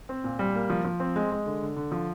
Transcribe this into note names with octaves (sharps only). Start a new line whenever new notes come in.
C4
A#2
G3
A#3
F3
F3
C4
G#3
G#3
D3
D3
D3
F3